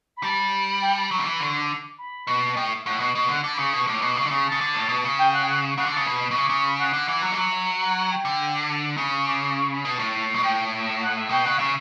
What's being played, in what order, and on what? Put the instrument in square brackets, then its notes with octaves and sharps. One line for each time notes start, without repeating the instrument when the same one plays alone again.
[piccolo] B5
[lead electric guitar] G3 [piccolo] A5
[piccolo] G5
A5
[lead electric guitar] F#3 [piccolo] B5
[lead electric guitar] D3
E3
[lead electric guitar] D3 [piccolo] C#6
[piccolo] D6
B5
[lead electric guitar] B2
[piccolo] A5
[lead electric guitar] A2 [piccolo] G5
[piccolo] E5
[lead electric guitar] A2 [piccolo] F#5
[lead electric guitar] B2
B2
[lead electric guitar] D3 [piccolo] F#5
[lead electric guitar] D3 [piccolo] A5
[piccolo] B5
[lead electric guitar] C#3 [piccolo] C#6
[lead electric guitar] B2 [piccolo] C#6
[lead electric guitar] A2 [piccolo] D6
[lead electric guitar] B2
C#3
D3
[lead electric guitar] C#3 [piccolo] C#6
[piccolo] A5
[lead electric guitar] C#3
D3
A2
B2
C#3
[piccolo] G5
F#5
G5
F#5
[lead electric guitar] C#3 [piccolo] F#5
[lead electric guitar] D3 [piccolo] A5
[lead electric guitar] C#3
[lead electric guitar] B2 [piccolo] B5
[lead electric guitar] B2
[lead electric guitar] C#3 [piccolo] C#6
[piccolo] D6
[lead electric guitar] C#3 [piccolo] C#6
[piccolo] B5
F#5
[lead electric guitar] D3
E3
F#3
E3
F#3
[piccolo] E5
F#5
G5
[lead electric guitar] D3
[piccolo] A5
[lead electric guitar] C#3 [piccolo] B5
[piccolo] C#6
D6
C#6
B5
[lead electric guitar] B2 [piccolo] A5
[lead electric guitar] A2
B2
[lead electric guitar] A2 [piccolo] G5
[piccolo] E5
F#5
E5
[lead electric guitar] B2 [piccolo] G5
[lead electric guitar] C#3 [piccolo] F#5
[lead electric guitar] C#3 [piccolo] E5